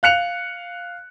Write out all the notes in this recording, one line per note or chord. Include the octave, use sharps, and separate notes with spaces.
F5 F#6 C#7 F7